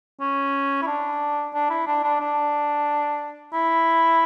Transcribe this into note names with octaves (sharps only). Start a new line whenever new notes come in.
C#4
E4
D4
D4
E4
D4
D4
D4
E4